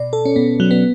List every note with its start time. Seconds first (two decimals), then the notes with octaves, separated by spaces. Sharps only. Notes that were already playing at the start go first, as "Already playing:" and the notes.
Already playing: B2 D5
0.13 A4
0.25 C#4
0.36 B2 B3
0.60 F#3
0.71 B3